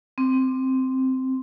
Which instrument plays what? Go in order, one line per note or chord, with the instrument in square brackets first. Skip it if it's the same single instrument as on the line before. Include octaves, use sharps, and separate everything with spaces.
[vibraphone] C4